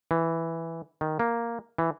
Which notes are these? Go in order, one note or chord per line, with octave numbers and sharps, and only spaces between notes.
E3
D#3
A#3
E3